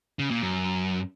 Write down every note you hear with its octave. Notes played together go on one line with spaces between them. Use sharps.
C#3
A#2
F#2